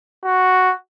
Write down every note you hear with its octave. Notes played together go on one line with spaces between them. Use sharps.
F#4